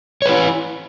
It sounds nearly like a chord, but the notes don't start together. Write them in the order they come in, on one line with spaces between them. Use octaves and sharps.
C#5 B4 E4